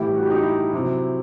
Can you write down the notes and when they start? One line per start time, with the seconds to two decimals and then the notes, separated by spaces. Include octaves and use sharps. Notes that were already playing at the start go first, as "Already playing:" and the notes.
Already playing: A2 E3 G3 E4 G4
0.15 F#4
0.23 G4
0.30 D#4 F#4
0.44 E4
0.73 C3 F#3 E4